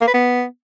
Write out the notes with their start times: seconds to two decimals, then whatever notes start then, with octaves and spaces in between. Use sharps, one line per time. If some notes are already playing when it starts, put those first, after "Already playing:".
0.01 A#3
0.07 B4
0.14 B3